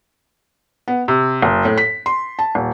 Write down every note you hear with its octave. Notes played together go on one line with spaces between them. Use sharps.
B3
C3
F#1
A2
B6
C6
A5
D#1